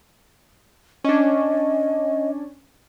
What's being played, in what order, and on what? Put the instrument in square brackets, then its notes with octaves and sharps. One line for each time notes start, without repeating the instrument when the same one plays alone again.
[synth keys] C#4 D4 [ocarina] D#5